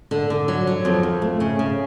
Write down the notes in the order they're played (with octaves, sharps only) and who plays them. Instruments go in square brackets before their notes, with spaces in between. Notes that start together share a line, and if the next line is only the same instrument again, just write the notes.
[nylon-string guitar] D3
D3
F#3
F#3
F2
F2
A3
C#3
C#3